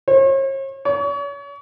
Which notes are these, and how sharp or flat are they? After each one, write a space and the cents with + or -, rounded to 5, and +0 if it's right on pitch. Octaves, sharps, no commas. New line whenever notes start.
C#5 -45
C#5 +35